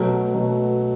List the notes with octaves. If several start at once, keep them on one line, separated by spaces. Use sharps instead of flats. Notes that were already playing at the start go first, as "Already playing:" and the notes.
Already playing: B2 F#3 A3
B2 F#3 A3